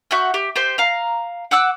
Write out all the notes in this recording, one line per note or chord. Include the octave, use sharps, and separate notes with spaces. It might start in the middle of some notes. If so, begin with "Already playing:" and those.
F#4 E5 F#5 G6
G4
G4 C5
F5 A#5
F#5 D6 E6 F#6